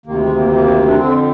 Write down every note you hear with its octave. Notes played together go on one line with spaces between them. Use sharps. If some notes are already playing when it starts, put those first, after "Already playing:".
D2 C3 D#3 A#3
G#3
A#3
A#3
D4
F2 D3 C4